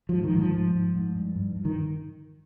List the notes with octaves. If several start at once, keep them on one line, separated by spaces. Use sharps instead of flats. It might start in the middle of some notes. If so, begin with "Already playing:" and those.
F3
G#2
D#3
G#2 F3
G#2
G#2
G#2
G2
G2
G2
D#3